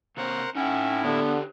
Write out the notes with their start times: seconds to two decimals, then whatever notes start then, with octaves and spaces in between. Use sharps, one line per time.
0.17 C3 A#3 A#4 C5 C#5 F#5
0.55 A2 C#4 D#4 E4 F#5 G5
1.04 D3 B3 G4 B4 C#5